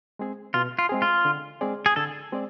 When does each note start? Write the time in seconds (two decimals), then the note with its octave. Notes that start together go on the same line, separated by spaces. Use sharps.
0.19 G#3 C4 G#4
0.54 B2 F4
0.79 F4
0.89 G#3 C4 G#4
1.02 F4
1.25 D3
1.61 G#3 C4 G#4 D5
1.86 G#4
1.96 D3 A4
2.32 G#3 C4 G#4 D5